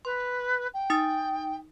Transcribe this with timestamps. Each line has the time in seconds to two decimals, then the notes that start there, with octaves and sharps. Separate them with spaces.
0.05 B4 C6
0.74 G5
0.90 D#4 D#6 A6